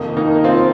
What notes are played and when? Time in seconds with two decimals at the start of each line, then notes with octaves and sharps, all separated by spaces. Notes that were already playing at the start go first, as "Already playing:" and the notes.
Already playing: F2 C3 D#3 A#3 D#4
0.17 A#3 D#4
0.44 C4 F4